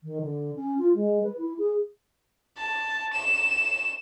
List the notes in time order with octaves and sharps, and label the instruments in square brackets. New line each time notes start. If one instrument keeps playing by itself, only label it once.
[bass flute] D#3
D3
C#4
F4
G#3
B4
E4
G#4
[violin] A5
E7